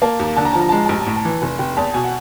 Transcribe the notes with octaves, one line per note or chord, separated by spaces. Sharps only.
A#3 A5
D#2
D3 A5
A#5
F3 A5
A#5
G#3 A5
A#5
A5
A1 A#5
A5
A2 A#5
A5
E3
F1 G#5
F1 G5
E2 A5
B2 G#5
F#5